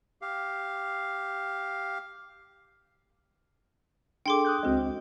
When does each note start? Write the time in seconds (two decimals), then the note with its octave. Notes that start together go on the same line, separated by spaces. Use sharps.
0.22 G4 F5
4.26 D4 G#4 A4 G5 C6 D6
4.45 D#6 F#6 G6
4.63 C#2 G#3 C4 F#4 D#5